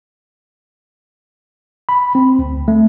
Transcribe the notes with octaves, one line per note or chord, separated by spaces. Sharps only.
B5
C4
D2
A3